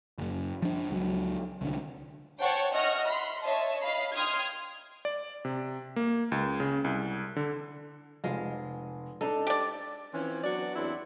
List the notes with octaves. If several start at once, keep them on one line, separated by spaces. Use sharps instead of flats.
F#1 F#2
F3 D4
C#2 F3 F#3
C2 D3
C5 C#5 F#5 G5 A5 C#6
D#5 E5 F#5 C#6 F6 A#6
B5 C6
C#5 D#5 E5 A5
D#5 F5 B5 C7
G5 C6 D#6 F6 G#6
D5
C3
A#3
C#2
C#3
C2
D3
F1 F3 G#3
D4 D#4 A4
G4 D5
E3 F3 C4 C#4
F#3 B3 D4 F#4 D5
E2 F#3 C4 D4 E4